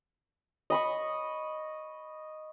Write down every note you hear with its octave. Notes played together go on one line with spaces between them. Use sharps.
D#5 B5 C#6